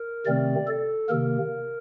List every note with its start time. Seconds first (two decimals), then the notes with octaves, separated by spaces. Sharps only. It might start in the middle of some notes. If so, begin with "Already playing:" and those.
Already playing: A#4
0.26 C3 D#3 A3 C4 D5
0.67 A4
1.09 C3 D#3 A#3 A#4